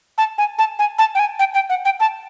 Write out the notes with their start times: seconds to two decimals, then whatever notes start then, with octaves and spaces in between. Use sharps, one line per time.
0.18 A5
0.38 G#5
0.58 A5
0.79 G#5
0.98 A5
1.15 G5
1.19 G#5
1.39 G5
1.54 G5
1.70 F#5
1.85 G5
2.00 A5